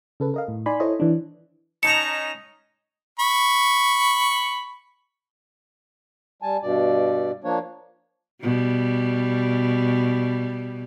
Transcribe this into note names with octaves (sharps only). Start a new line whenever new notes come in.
C#3 A4 B4
A#4 D#5 F5
A2
D#4 D5 G#5 B5 C6
E4 A4 C5 C#5 D#5
E3 D4
C#4 D#4 A5 A#5 C#7
B5 C#6
G3 G#5 A5
G2 B2 D5
F3 A#3 D4 C#5
B2 G3